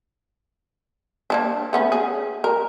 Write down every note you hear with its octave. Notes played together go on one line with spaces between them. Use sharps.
A#3 C#4 D4
A3 B3 C#4
G#4
A#4